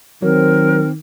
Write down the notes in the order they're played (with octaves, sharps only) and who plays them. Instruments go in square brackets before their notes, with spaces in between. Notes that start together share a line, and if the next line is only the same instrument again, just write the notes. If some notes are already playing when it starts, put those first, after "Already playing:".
[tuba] D#3 [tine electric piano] F#3 [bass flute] C4 [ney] A#4